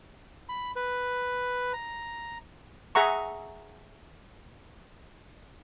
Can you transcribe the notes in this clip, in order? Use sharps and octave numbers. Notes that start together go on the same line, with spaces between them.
B5
B4
A#5
G#4 E5 F#5 A#5 C#6